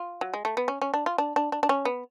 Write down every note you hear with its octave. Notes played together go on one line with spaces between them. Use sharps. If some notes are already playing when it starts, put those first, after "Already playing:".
Already playing: F4
F#3
G#3
A3
B3
C#4
C#4
D4
F4
D4
D4
D4
D4
C#4
B3